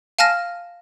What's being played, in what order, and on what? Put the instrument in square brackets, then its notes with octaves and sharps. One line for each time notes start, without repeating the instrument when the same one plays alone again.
[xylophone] F5 G#5 A5 F6 A#6